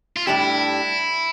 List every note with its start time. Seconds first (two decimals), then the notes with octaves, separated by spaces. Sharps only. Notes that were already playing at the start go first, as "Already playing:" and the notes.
0.16 F4
0.27 A2 G3 D4 E4 G4